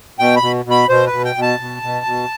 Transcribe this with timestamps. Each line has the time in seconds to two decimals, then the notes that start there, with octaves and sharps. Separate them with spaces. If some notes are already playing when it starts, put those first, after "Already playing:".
0.19 B2 G5
0.36 B5
0.42 B2
0.65 B2
0.71 B5
0.89 B2 C5
1.07 B4
1.12 B2
1.24 G5
1.36 B2
1.42 A5
1.60 B2
1.82 B2
2.06 B2